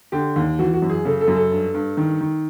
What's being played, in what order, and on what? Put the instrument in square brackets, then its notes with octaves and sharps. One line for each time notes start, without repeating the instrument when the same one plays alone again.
[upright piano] D3 G4
D#2
E3 F#4
F#4
F#2
G#4
C#3 A4
A4
F#2
A4
G2
G2
D#3
D#3